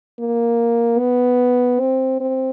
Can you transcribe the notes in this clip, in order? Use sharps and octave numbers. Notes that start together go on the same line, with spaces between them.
A#3
B3
C4
C4